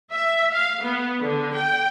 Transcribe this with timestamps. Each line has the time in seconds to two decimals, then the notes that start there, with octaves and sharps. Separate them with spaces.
0.12 E5
0.52 F5
0.83 B3
1.21 D3
1.56 G5